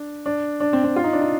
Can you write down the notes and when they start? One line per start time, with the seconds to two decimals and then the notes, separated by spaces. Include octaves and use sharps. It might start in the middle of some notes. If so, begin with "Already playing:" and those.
Already playing: D4
0.26 D4
0.60 D4
0.73 C4
0.84 C4
0.96 F4
1.04 D#4
1.13 D4
1.21 D#4